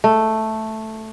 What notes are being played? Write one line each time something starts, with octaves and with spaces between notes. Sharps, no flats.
A3